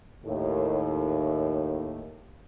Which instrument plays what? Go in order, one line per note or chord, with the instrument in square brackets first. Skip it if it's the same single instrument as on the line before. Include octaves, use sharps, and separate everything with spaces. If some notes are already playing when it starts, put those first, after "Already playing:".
[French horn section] D#2 A2